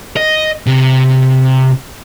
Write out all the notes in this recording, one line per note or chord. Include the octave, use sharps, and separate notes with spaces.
D#5
C3